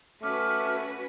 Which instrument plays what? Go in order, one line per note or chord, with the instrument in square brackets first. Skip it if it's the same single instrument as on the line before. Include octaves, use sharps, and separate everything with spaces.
[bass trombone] A3 [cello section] C#4 F#4 B4 [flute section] D6 F6